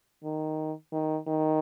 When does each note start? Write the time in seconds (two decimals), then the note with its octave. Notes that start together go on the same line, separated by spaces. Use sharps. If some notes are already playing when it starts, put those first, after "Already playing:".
0.24 D#3
0.93 D#3
1.27 D#3